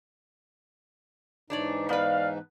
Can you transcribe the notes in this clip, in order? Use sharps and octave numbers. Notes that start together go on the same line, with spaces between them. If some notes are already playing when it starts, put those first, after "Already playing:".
G#2 E3 D4 D#4 C#5 D5
B3 B4 D5 F5